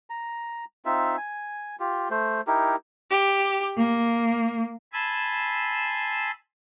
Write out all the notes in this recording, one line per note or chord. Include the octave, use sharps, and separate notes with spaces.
A#5
C4 D#4 F4 E5
G#5
F4 G4
A3 C5
D#4 E4 G4 A#4
G4
A#3
G#5 A5 B5 C6 E6